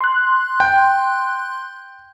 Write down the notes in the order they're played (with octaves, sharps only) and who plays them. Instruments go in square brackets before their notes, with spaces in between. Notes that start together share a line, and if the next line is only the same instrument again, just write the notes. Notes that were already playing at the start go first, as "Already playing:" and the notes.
[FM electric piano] C6 F#6
[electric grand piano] G5